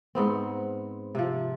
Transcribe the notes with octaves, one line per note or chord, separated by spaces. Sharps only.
G#2 B3 C4
C3 F3